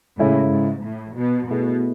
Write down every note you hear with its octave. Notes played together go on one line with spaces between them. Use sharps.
A2 C#3 G#3 C#4 E4 A4
G#2
A2
B2
B2 A3 E4 G#4